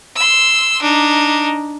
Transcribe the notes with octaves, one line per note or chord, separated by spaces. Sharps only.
C6 E6
D4 D#4